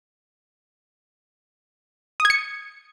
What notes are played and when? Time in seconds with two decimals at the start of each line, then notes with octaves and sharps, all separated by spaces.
2.20 D#6
2.25 G#6
2.30 C#7